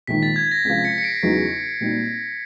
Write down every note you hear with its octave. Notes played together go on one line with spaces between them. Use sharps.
A#1 G#2 D#3 B6
A6
G#6
A#6
C#2 C3 F3 B6
B6 C#7
C#7
C7 D7
E2 C#3 F#3 B3 D#4
A#2 G3 C4 D#4 F#4